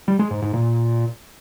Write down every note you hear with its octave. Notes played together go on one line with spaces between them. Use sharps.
G3
G#3
G#2
G#2
A#2